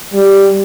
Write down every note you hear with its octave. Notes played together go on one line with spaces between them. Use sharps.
G3